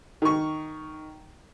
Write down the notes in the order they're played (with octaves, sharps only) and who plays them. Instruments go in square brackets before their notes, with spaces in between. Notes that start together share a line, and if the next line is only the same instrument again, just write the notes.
[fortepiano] D#3 C#6